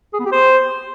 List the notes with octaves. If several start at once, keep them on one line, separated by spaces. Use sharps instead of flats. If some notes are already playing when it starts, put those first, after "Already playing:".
G#4
B3
G4
C5